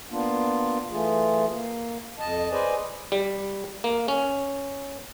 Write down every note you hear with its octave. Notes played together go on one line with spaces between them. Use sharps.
A#3 B3 D4 F4
E3 A3 F4 G#4
A#3
F2 D#5 A5
G#4 B4 C5 D5 D#5 G#5
G3
A#3
C#4